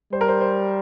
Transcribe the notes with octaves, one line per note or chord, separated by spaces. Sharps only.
G3 C5
A#4
C5
C5